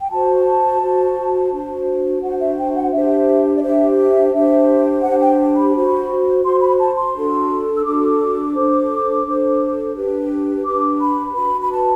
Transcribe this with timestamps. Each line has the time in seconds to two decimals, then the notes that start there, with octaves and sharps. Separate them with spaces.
0.01 G5
0.11 F#4 C5 A5
0.82 F#4 C5
1.52 D4 F#4 C5
2.22 D4 F#4 C5 F#5
2.39 E5
2.57 G5
2.75 F#5
2.92 D4 G4 C5 E5
3.56 D5
3.62 D4 G4 C5 E5
3.98 E5
4.33 D4 G4 C5 E5
5.03 D4 G4 C5 F#5
5.21 G5
5.56 B5
5.74 F#4 C5
6.43 F#4 C5 C6
6.61 B5
6.79 A5
6.96 C6
7.13 D4 F#4 A4
7.77 E6
7.84 D4 F#4 A4 D6
8.55 D4 A4 C5
9.25 D4 A4 C5
9.95 D4 G4 B4
10.65 D4 G4 B4 D6
11.01 B5
11.35 F#4 B4 B5
11.62 B5
11.71 A5